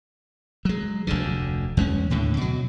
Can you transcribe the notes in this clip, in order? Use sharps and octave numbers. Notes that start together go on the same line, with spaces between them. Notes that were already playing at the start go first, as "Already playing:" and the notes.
F#3 G#3
F1 D2 D3
E2 G#3 C#4
D#2 A2 D3
B2 F#3